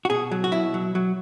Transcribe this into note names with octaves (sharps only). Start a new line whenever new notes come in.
F#4
B2 G#4
F#3
F#4
B2 E4
F#3
F#3